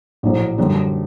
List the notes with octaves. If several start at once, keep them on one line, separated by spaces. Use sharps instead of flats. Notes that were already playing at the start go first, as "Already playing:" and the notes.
A#1 A2 F#3
F#2 D3 G3